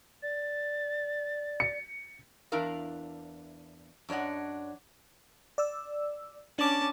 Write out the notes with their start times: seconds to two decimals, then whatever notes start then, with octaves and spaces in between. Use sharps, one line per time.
0.22 D5 A6
1.60 C#7
2.52 E2 D4 E4 A#4 F5
4.09 F#2 D4 C#5 D#5 F#5
5.58 D5 E6
6.59 C#4 D4 A5 D6